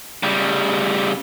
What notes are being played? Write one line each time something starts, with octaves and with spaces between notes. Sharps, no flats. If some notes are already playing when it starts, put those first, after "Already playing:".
C#3 G3